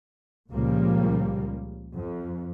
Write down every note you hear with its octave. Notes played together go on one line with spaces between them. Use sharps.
C#2 A#2 C#3 F3 G3 A#3
F2